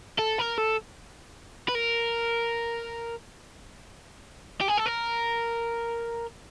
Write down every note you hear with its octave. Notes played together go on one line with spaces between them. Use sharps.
A4
A#4
A4
B4
A#4
G4
G#4
A4
A#4